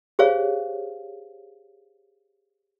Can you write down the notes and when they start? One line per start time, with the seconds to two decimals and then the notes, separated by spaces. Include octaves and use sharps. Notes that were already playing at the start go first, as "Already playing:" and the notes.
0.19 G4 G#4 C5 C#5 F5